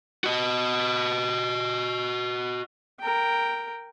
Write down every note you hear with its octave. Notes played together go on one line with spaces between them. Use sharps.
F#4 D#5
A#4 G5